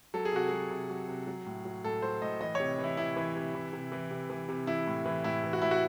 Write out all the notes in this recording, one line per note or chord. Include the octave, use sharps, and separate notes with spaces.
F#3 A4
G#4
C3 F#4
F#3 G#4
C3
F#3
C3
F#3
A2
F#3
A2 A4
F#3 C5
A2 D#5
E3 D#5
C3 C#5
E3
E4
C3 E4
E3
C3
E3
C3
E3
C3
E3
C3
E3 E4
A2
E3
A2 E4
E3
F#4
A2 E4
F#4